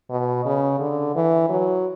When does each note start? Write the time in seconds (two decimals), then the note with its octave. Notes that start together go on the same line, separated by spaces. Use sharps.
0.10 B2
0.46 C#3
0.80 D3
1.15 E3
1.49 F#3